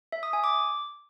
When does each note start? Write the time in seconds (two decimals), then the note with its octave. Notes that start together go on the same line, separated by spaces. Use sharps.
0.12 E5
0.23 D#6
0.33 G#5
0.44 D6